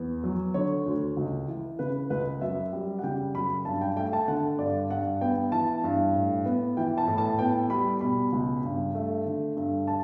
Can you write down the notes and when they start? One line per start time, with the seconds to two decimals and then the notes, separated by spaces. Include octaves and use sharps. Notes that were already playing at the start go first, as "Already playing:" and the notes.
Already playing: E2 B3
0.24 F#3
0.54 D3 C#5
0.86 D2
1.17 C#2
1.48 E3
1.79 C#3 B4
2.10 C#2 B4
2.41 F#2 E5
2.73 G3
2.99 F#5
3.03 C#3 G5
3.35 F#2 B5
3.65 G2 A5
3.81 G5
3.96 A3 G5
4.13 A5
4.28 D3 F#5
4.58 G2 D5
4.90 G2 F#5
5.21 B3 G5
5.52 E3 A5
5.84 G2
6.15 A2
6.46 B3
6.77 E3 G5
6.98 A5
7.07 A2
7.18 A5
7.39 B3 G5
7.70 G3 B5
8.01 B2 B5
8.32 C#2
8.63 G2
8.95 A3
9.26 D3
9.57 G2
9.88 A5